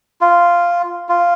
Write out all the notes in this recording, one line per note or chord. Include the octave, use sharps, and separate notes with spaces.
F4
F4